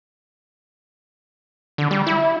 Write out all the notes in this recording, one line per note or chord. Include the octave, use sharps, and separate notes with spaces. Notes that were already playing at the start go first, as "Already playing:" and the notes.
D3
G3
E4